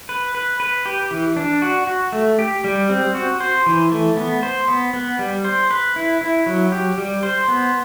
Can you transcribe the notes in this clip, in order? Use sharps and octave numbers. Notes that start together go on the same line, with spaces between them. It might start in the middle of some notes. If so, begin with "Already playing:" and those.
B4
B4
B4
G4
E3
D4
F#4
F#4
A3
G4
G3
C4
F#4
C5
E3
A3
B3
C5
B3
B3
G3
C5
B4
E4
E4
F#3
G4
G3
C5
B3